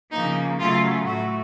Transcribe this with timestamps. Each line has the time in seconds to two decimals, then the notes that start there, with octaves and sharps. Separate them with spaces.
0.11 C#3 F3 A#3 D#4
0.59 C#3 F#3 A3 F4
1.06 A2 A3 F#4